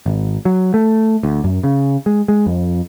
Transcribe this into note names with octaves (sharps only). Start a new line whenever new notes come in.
G#1
F#3
A3
D2
F#2
C#3
G#3
G#3
F2